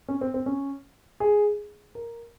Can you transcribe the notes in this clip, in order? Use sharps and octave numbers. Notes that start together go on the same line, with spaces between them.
C#4
C4
C4
C#4
G#4
A#4